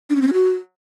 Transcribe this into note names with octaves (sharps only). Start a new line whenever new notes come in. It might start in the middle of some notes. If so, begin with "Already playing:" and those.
D4
C#4
C4
C#4
F#4